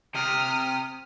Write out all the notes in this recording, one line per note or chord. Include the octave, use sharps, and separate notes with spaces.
C3 G4 D#6 F6